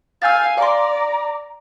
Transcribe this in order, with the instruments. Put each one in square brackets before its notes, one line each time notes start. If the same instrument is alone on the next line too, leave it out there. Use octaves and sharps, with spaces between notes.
[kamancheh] F5 G#5 [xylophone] E6 G6 A6
[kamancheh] D5 [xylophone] F5 C6 [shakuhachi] A#5